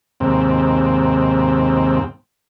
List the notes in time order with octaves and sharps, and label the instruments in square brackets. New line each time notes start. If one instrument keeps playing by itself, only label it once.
[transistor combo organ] D#2 G#2 C3 C4